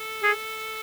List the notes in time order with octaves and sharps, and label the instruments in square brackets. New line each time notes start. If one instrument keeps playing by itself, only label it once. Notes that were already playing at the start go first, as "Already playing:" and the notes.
Already playing: [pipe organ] A4
[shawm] G#4